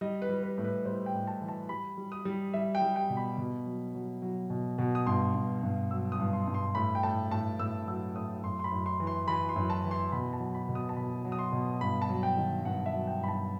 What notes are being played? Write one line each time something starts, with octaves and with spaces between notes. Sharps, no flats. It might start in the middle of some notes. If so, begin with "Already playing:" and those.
G3 D#5
B4
G3
B4
A2
B4
G3 C5
G5
A2
A5
E3
A5
G3 B5
G3
D#6
G3
G3 E5
G5
G3
G5
B2
B5
B2
F#3
F#3
F#3
B2
B2
D#6
G2 C6
G2
G2
F#3 E6
D#6
G2
C6
G2
C6
A2 B5
G5
A2 A5
A2 A5
A2 E6
F#3 E6
A2 D#6
F#2 C6
C6
B5
F#2
C6
E3
C6
E3 B5
C6
F#2
A5
E3
C6
B2 B5
A5
F#3
B5
B2
D#6
A5
B2 B5
F#3
D#6
C6
B2
G2 B5
A5
F#3
G5
D#3
G2 F#5
E5
F#3
G5
G2 B5
A5